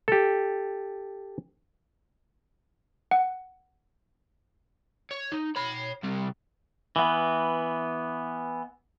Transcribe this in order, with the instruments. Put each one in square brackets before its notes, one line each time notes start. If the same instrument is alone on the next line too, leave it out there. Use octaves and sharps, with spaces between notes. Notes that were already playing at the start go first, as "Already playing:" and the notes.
[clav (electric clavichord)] G4 A4
[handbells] F#5
[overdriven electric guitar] C#5
D#4
C#5 B5
C3 G3
[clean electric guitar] E3 B3